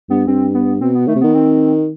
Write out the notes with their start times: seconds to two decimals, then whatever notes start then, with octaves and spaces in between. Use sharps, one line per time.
0.10 G2 B3
0.27 G2 C4
0.54 B3
0.81 B2 C4
0.95 B3
1.08 D#3 A3
1.16 C3
1.21 D#3 B3
1.34 C4